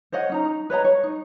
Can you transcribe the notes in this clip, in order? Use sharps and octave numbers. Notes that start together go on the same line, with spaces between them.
C5 C#5 D#5 F#5
C#4 D#4 A#5
D#4
B4 C#5 D#5 A#5
C#5
D#4